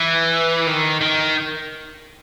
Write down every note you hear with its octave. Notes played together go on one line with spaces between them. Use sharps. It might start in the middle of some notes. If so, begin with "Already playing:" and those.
Already playing: E3
D#3
D#3